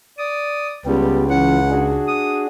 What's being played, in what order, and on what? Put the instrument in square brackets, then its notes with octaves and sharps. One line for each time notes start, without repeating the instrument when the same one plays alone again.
[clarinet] D5 [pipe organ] D#6
[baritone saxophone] C#2 [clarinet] G3 [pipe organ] B3 G4
[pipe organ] E3 C#4 [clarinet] F#5
[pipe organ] D4 F#4 G#4
[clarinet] D#6